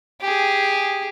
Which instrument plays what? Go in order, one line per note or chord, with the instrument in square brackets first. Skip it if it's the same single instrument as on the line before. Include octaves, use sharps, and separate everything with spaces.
[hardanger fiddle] G4 G#4